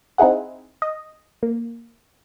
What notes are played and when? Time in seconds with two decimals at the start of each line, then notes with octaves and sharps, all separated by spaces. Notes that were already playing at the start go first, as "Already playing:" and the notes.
0.18 C4 D#4 E4 G#4 F#5
0.82 D#5
1.43 A#3